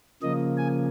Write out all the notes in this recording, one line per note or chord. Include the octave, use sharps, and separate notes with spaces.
C#3 F3 A#3 D#5
G#5